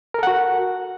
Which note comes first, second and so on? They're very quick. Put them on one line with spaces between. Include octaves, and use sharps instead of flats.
A#4 A4 F#5 F#4